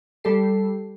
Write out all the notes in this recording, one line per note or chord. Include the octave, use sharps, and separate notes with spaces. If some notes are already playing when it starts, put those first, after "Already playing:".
G3 G4 A4 C7